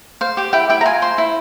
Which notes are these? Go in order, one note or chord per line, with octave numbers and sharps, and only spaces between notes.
C5 F5
G4 G5
E4 G5
E4 G5
A#5
F4 G#5
C5 C6
E4